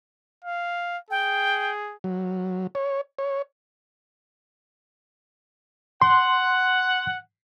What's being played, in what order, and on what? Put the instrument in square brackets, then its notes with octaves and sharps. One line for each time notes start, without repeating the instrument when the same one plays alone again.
[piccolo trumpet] F5
[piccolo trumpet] G#4 [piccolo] G5
[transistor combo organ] F#3
C#5
C#5
[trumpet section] F#5 [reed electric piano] C6